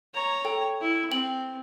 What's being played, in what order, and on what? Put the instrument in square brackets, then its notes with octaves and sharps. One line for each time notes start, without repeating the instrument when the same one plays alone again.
[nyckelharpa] C#5 A#5
[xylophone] A4 G5
[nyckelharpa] E4
[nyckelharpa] C4 [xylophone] G5 F#7